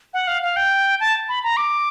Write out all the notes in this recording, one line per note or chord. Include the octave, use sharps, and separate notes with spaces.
F#5
F5
F5
G5
A5
B5
A#5
D6